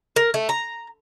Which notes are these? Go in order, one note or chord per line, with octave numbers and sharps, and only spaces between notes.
A#4
A3
A#5